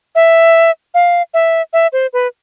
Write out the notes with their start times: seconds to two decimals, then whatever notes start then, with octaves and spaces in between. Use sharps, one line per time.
0.15 E5
0.94 F5
1.34 E5
1.73 E5
1.93 C5
2.13 B4